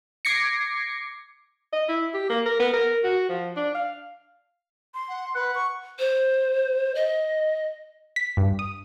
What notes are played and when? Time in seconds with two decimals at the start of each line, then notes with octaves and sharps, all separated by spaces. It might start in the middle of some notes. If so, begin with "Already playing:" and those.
0.25 D6 G#6 A#6 C7 C#7
1.73 D#5
1.88 E4
2.14 G4
2.29 A#3
2.46 A#4
2.59 B3
2.73 A#4
3.04 F#4
3.29 F3
3.56 D4
3.75 F5
4.94 C6
5.09 F#5
5.35 B4 F#5
5.55 C#6
5.99 C5
6.95 D#5
8.16 B6
8.37 G2
8.59 D#6